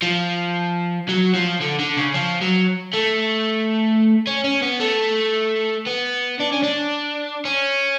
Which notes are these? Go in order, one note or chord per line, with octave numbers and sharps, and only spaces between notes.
F3
F#3
F3
D3
D3
C#3
F3
F#3
A3
C#4
C#4
B3
A3
B3
D4
C#4
D4
C#4